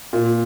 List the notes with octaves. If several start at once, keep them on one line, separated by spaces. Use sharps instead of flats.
A#2